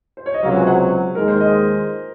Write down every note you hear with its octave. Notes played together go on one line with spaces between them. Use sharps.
C5
C#5
D#5
C#2 C3 F#3 F5
G#5
F#5
D#2 D#3 G#3 A#4
C5
D#5